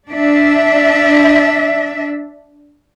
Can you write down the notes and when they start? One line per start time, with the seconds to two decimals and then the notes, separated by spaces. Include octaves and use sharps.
0.11 D4 E5